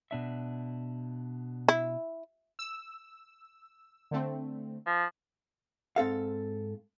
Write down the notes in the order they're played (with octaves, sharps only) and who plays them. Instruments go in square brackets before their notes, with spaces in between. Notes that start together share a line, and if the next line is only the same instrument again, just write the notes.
[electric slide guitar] B2 D4 E5
[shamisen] E4
[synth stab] E6
D3 A3 C4
[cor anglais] F3
[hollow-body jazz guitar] G#2 C4 A4 F5